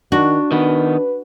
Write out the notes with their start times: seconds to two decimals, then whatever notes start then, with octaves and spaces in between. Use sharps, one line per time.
0.12 D#3 D4 F#4
0.52 D#3 B3 B4